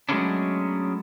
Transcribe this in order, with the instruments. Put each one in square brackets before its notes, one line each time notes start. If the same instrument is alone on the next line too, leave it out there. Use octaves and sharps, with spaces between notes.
[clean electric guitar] F#3 G#3 A3 B3 C#4 D4